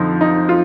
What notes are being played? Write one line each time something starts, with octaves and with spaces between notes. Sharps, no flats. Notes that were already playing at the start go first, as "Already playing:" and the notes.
Already playing: F2 D3 F3 D#4
D#4
F4